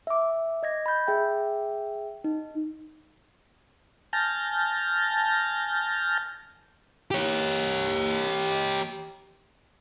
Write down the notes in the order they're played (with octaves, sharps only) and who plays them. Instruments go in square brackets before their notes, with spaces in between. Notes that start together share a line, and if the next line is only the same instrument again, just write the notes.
[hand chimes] E5 D6
D#5 G#6 A#6
B5 G6
G#4 E5 G5
D#4
[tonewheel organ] G#5 A5 F6 G6 A6 A#6
[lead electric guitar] G4 C#5